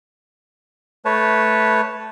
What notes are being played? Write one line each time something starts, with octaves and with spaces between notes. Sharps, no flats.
A3 B4 C#5 A5